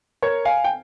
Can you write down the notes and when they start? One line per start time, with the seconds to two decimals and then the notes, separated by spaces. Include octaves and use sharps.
0.22 A#4 C#5
0.45 F5 G#5
0.64 G5